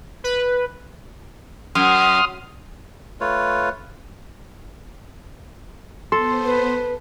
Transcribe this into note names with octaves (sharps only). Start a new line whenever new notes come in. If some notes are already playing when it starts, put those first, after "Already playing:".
B4
F#2 C6 D#6 F6
A3 F4 B4 C#5
B3 A4 C5 C6
B4